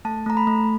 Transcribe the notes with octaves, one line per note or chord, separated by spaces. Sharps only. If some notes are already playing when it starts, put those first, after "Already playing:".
A3 A5
A3 A#5
B5
A3